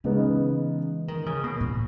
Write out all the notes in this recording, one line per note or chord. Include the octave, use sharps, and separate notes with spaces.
C#3 E3 G#3 B3 D#4
D#3
C#3
B2
A#2